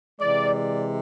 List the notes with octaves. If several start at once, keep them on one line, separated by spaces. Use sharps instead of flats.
C3 E3 G#3 D5
D5